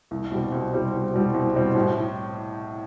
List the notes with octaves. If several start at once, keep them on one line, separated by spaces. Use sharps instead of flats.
C2
B2 G3 C4
C2
B2 G3 C4
C2
B2 G3 C4
C2
B2 G3 C4
A2